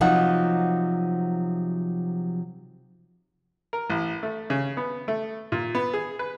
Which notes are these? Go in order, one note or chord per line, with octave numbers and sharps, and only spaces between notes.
C3 F3 F#3 D#4 F#5
A#4
A1
A3
C#3
B3
A3
A#2
B3
G#4
B4